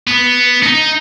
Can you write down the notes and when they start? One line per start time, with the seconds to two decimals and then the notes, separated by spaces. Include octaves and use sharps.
0.08 B3
0.63 D#4